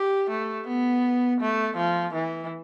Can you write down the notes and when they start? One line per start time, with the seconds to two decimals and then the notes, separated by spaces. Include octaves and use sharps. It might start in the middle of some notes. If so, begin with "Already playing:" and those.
Already playing: G4
0.30 A3
0.67 B3
1.40 A3
1.77 F3
2.14 E3